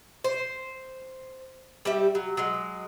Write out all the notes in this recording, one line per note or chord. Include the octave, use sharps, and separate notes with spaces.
C5
G3 G4 E5
F#3
F#3 G#3